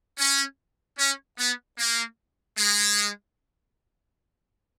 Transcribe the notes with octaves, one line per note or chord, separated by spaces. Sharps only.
C#4
C#4
B3
A#3
G#3